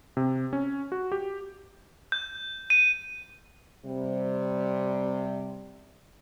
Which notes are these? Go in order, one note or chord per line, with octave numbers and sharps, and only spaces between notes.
C3
C#4
F#4
G4
G6
D#7
C3 G3